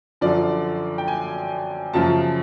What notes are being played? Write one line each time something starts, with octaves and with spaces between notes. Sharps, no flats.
F#2 D3 F3 D5
G5
G#5
F#2 C#3 F3 A5